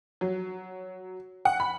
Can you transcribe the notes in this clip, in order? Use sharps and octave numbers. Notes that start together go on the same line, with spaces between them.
F#3
F#5
B5